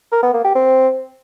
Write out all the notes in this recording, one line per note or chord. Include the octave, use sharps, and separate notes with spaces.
A#4
B3
A#3
G4
C4